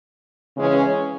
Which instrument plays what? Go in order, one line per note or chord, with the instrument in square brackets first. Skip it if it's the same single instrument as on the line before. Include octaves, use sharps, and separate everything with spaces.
[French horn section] C#3 E3 G#3 C#4